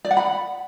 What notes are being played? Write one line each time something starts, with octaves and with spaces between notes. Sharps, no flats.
D5
F#5
B5